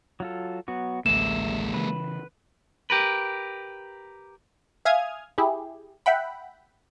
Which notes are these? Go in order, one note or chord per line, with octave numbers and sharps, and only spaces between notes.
F#3 F4 A4
F#3 B3 F#4
A1 D2 G#3 A#3 E5 E7
C#3 E3 B4
G4 A#4 B4
E5 F5 G#5 D#6 F6 G#6
E4 G4 G#4
E5 F#5 G5 B5